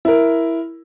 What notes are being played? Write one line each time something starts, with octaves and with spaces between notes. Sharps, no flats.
E4 A#4